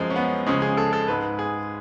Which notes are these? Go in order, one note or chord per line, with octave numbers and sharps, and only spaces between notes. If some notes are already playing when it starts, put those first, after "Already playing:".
Already playing: F#2 F3 G#3
C#4
B3
C#2 C#3 F3 G#3 C#4
G#4
A4
A4
G#2 G#3 B4
G#4